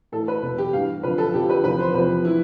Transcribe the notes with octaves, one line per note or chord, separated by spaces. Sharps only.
A2 E3 A4
B4
E2 B2
G4
G2 E3 F5
F2 D3 F3 B4
A4
F2 D3 F3 G4
B4
E2 C3 F3 B4
C5
E2 C3 F3 B4
E3 E4